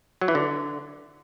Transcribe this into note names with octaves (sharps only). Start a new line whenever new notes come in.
F#3
E3
D3